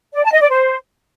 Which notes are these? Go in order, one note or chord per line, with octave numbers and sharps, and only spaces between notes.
D5
A5
D#5
D5
C5